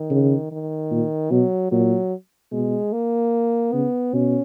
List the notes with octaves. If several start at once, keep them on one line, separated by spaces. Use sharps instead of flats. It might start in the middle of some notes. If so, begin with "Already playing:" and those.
Already playing: D#3
C#3
D#3
A#2
B2 F#3
A#2 F#3
B2 G#3
A#3
C#3 B3
B2 C#4